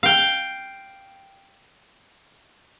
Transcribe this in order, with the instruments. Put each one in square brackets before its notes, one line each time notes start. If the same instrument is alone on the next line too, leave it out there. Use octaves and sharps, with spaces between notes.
[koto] F5 G5